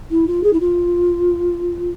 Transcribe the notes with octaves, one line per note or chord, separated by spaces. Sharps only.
E4
F4
G#4
E4
F4